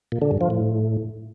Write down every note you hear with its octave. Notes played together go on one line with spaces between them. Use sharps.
A#2
D3
G2
F3
A2